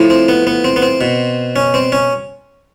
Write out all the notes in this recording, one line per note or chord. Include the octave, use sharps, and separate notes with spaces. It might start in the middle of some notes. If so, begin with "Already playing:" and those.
Already playing: A2 F3
C4
B3
B3
C4
B3
C4
B2
C#4
C4
C#4